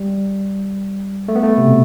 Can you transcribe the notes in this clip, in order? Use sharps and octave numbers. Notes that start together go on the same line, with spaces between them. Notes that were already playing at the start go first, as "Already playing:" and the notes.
Already playing: G3
A3
B3
A3
C3
B2